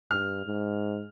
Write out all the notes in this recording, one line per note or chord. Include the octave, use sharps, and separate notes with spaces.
G2 F6
G#2